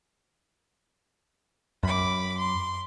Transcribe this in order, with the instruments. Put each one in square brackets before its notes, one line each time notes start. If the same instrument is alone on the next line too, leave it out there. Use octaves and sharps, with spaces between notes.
[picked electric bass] F#2 [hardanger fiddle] B5 D6
[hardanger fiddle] C6